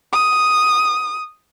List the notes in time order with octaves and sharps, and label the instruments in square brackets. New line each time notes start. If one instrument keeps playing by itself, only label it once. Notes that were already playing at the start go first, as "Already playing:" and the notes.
[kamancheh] D#6